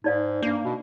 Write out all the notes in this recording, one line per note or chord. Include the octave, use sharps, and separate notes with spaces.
G#2 D#4 D5 F5
G2 A#3 D4
B2